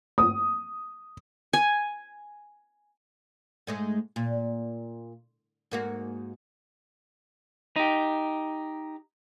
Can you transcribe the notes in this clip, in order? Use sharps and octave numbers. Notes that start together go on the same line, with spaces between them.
D#6
G#5
G#2 G#3 A3
A#2
G#2 A#3 F#4
D#4 G4